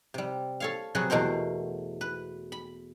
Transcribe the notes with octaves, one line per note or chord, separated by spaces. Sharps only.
C3 G3
A4 C#5 F5
C3 F#3 F#4 G#4 B4
E2 B2 A3 A#4 C5
B4
B5